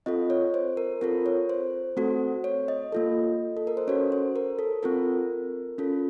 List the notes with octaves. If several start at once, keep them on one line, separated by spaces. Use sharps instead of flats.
C4 F4 A4 D#5
C#5
C5
A#4
C4 F4 A4 A#4
C#5
C5
A3 C4 F#4 A4
C#5
D#5
A#3 F4 A4
A4
A#4
C5
C#4 F#4 A4 C#5
C5
A#4
A4
C4 F4 A4 A#4
C#4 F4 A4